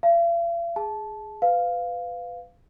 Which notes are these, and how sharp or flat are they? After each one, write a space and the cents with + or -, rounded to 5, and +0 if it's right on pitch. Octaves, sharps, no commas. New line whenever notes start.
F5 -45 A5 +0
G#4 +0 A5 -15
B4 +25 F5 +0